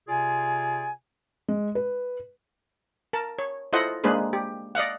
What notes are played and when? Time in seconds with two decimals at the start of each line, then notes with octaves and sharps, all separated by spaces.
0.08 C3 F4 G#4 D5 G#5
1.48 G#3
1.75 B4
3.13 A#4 A5
3.39 C#5
3.73 E4 F4 A4 C5 D#5 F#5
4.04 G#3 A#3 D4 G#4 B4 C5
4.33 G4
4.75 D5 D#5 F5 F#5